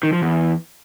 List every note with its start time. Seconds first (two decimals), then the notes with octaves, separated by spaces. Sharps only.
0.03 D#3
0.13 F3
0.22 E2